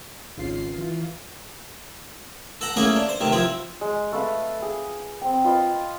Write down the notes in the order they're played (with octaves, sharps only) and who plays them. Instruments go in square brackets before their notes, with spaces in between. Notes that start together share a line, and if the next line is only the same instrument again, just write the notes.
[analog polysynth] G#1 C#2 F4 C7
E3 F4
[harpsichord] A4 F#5 A#5
A3 A#3 C#4 E4 G#4
D4
C5
C3 D#3 A3
F3 C4 E4
[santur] G#3
A3 A4 B4 F5
G#4
C4 G5
F4 B4 D#5